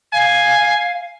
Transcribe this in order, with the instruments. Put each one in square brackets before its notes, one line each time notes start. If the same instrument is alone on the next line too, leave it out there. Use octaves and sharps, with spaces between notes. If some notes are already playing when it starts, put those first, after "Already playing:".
[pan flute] F5 [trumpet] G#5